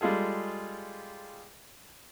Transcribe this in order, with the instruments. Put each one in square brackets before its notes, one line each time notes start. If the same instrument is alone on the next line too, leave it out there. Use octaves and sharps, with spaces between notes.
[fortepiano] G3 G#3 F4 G#4 A4